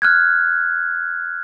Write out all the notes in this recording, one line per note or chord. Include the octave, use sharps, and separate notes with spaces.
F6 F#6 G#6